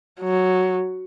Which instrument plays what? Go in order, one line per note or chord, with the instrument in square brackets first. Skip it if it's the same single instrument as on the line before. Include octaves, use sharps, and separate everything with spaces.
[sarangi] F#3